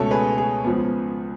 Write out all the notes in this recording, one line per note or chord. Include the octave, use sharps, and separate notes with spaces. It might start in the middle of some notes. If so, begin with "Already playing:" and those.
Already playing: C#2 B2 A3 C#4 A4 C#5
G#4 B4
G#4
C#2 C#3 F3 B3